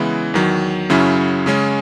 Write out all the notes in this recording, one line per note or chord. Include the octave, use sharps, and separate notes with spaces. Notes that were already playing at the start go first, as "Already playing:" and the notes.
Already playing: C#3 E3 G#3 B3 E4
E2 D#3 F#3
F#2 C#3 F#3 C#4 E4
C#3 G#3 C#4